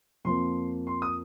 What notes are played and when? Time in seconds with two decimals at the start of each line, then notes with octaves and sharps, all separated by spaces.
0.25 F2 F3 A#3 C6
0.87 C6
1.02 D#6